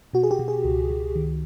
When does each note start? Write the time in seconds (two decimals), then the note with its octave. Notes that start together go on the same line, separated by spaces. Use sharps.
0.13 B2 F#4
0.23 G#4
0.31 G4
0.39 B2
0.48 G#4
0.64 C#2
0.90 C#2
1.15 D#3